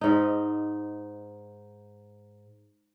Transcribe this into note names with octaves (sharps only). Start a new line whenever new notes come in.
G#2 D#4